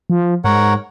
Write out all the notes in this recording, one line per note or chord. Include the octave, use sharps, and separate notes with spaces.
F3
G#2 A#4 C#5 F#5